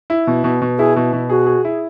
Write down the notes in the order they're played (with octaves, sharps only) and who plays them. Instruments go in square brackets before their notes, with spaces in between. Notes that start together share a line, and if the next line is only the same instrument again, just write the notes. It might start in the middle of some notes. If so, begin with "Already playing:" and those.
[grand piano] E4
B2
B2
B2
[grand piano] E4 [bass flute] G#4
[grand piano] B2
B2
[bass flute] F#4 [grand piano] G#4
[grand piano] G#4
E4